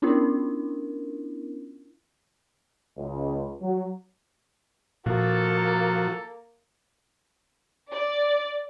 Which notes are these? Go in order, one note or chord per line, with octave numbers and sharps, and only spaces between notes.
B3 C#4 D4 E4 F4 A#4
C#2
F#3
A#2 F3 A#3 F#4 A4
D5